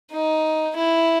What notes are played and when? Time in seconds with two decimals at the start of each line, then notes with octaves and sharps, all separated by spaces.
0.12 D#4
0.76 E4